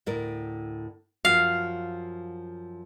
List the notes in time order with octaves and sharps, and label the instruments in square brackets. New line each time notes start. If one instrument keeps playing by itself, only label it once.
[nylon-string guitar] D2 A2 A#4
[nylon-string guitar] F#2 F3 F#4 [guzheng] F5